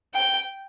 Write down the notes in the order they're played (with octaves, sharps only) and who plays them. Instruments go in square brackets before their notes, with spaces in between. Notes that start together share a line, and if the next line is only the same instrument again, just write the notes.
[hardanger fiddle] G5